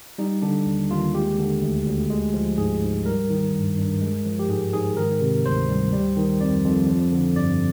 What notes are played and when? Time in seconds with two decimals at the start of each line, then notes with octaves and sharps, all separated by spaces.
0.18 G3 D#4
0.42 D3 D4
0.66 D#2
0.90 D#2 F4
1.14 G#3 G4
1.39 D3
1.62 D2
1.87 D2
2.10 G#3
2.33 F3
2.58 G#2 G#4
2.82 G#2
3.05 G3 A#4
3.30 D#3
3.54 G2
3.78 G2
4.01 G#3
4.26 F3
4.39 G4
4.49 G#2 G#4
4.73 G#2 G#4
4.97 D#3 A#4
5.21 C3
5.44 D2 C5
5.69 G3
5.93 G3
6.17 D#3
6.41 F2 D5
6.65 F2
6.89 F3
7.12 D3
7.36 G2 D5